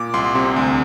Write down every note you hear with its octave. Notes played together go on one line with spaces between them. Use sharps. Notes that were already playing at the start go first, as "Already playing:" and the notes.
Already playing: A#2 D6
C2 C6
C3
D2